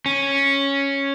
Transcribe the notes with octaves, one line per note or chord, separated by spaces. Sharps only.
C#4